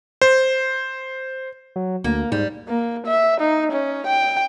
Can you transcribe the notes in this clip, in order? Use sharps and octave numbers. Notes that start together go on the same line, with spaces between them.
C5
F#3
D2 A#3
G#2 G3
A#3
E5
D#4
C#4
G5